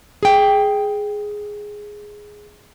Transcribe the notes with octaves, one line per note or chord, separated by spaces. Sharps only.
G#4 G5